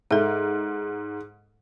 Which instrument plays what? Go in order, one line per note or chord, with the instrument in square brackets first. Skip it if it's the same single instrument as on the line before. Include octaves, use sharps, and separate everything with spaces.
[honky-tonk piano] G#2 [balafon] A4 E5